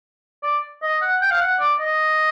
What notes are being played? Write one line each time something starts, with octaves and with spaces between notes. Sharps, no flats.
D5
D#5
F#5
G5
F5
F#5
D5
D#5